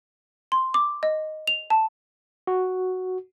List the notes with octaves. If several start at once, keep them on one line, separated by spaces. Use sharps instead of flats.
C6
D6
D#5
F7
A5
F#4